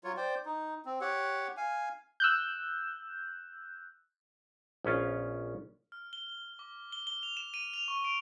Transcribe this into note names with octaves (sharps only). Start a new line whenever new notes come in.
F#3 F4 C#5
C5 D5 G5
D#4
C4
G4 C#5 F#5
F5 G#5
E6 F#6 G6
A#1 B3 C#4 F4
F6
G7
D6
G7
G7
F7
E7
D#7
F7
C#6
D7